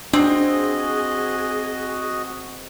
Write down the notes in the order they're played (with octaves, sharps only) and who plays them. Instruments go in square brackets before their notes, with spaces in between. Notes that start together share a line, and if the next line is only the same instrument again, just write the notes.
[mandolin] C4 [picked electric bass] D4 [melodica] F#4 D#5 [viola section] G#4